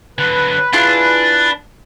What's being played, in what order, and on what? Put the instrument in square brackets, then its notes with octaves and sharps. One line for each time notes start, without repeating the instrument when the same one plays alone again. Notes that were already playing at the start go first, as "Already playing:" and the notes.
[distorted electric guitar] D3 F#3 [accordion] B4
[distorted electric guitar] D4 [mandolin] E4 F4 G#4